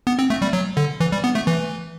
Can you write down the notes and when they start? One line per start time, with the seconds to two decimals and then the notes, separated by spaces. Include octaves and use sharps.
0.07 B3
0.19 C4
0.30 A3
0.42 G3
0.53 F#3
0.77 D3
1.00 E3
1.12 G3
1.24 B3
1.35 A3
1.47 E3